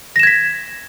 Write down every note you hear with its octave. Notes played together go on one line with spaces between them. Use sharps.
G#6 A#6 B6 E7